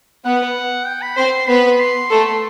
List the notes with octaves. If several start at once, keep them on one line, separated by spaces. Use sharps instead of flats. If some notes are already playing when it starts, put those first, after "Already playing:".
B3 B4 F#5
G5
B5
C4 C5 C6
B3 B4 B5
C6
A3 A4